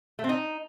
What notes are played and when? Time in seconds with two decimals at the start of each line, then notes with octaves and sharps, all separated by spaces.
0.19 A3
0.24 C4
0.29 D#4